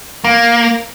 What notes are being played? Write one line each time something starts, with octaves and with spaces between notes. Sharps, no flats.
A#3